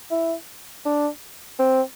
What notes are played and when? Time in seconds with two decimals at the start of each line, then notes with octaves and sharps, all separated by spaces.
0.11 E4
0.86 D4
1.59 C4